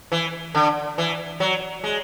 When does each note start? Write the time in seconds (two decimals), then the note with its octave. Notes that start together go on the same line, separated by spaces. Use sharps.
0.12 E3
0.55 D3
0.98 E3
1.40 F#3
1.84 G#3